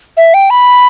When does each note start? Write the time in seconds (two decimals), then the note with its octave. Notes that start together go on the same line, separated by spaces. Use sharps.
0.17 E5
0.34 G5
0.50 B5